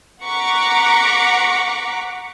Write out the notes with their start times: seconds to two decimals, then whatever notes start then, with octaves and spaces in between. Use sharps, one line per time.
0.23 F#5 A#5 C#6 D6 B6 C#7